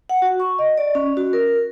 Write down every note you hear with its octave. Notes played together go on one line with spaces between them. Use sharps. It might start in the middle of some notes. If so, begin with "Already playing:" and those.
F#5
F#4
C#6
D#5
D5
C#4
F#4
A#4